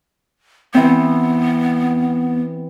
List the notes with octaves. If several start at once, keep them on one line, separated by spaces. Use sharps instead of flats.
E3 B3 C4